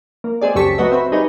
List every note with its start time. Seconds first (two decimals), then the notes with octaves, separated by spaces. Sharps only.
0.24 A#3
0.41 G#3 C4 G#4 D5
0.55 C#2 F#2 G4 A4 C#6 B6
0.78 F#3 A3 F#4 B4 D#5 E5
0.92 C4 E5 B5
1.12 G3 D#4 G#4 B4 C#5